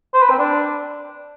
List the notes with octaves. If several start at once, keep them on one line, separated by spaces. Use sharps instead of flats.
C5
B4
C4
D4